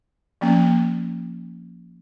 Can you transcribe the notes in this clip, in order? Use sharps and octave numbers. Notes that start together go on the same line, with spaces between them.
F3 A#3 C#4